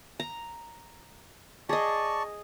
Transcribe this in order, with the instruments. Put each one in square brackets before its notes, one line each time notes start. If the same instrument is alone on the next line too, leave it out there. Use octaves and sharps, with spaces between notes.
[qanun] A#5
[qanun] G#4 D#5 [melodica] D5 A5 C#6